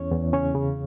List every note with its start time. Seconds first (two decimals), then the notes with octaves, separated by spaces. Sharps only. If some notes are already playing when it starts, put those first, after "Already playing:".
Already playing: E2 C#4 C#5
0.11 E2
0.33 C#3 C#4 C#5
0.55 C#3